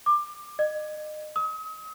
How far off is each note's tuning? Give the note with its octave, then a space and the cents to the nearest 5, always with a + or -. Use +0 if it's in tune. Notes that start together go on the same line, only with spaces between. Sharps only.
D6 +20
D#5 -35
D#6 +40